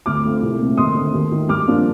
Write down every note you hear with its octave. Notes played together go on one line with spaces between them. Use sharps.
D2 D6 F6
D3 A3 C4 F4
C2
A#2 A3 C4
D#2 C6 D#6
D3 A3 C4
D#2
D#3 A3
G2 D6 F6
F3 A#3 D4 F4